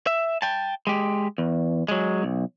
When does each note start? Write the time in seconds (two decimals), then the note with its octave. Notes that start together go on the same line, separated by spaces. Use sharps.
0.07 E5
0.42 G5 A5
0.87 G#3 G4
1.38 E2
1.89 F#3 G#3
2.23 B1